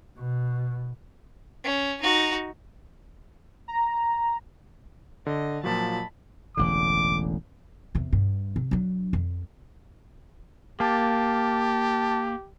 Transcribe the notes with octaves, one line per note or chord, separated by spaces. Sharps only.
B2
C#4
D#4 F#4
A#5
D3 D#5
A#2 F3 F#3 A5 B5
E1 A1 D3 D6
E2 C3
G2
C3
F#3 D4
F2
A#3 G4 A5